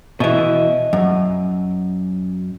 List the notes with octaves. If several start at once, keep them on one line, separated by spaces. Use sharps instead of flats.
B2 E3 D#5 E5
F#2